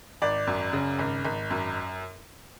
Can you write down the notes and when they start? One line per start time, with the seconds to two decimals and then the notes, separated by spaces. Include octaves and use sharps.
0.22 G#1 D5
0.47 F#2
0.73 C#3
0.99 G#1
1.25 G#1
1.50 F#2